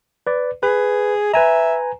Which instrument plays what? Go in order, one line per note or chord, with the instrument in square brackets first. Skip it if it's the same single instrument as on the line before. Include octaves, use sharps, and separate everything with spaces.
[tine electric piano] B4 D5
[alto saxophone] G#4 [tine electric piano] B4
[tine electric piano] B4 G#5 A#5 [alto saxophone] E5